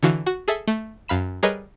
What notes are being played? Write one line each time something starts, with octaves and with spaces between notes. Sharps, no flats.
D3 E3 F#4 F5
F#4 F#5
G#4 A4 E5
A3
F#2 F5 B5 E7
G3 G#4 A#4 B4 C#5 D#5